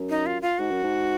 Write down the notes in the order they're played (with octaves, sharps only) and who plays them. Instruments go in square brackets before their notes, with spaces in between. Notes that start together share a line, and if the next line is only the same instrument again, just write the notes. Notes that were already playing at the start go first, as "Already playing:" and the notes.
Already playing: [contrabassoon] F#2
[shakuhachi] D#4
F4
F4
[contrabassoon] G#2 [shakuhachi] F#4
[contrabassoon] F#2
G#2